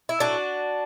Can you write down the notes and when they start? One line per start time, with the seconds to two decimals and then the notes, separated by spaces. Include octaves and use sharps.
0.09 E4
0.20 A2 F#3 A3 D4 F#4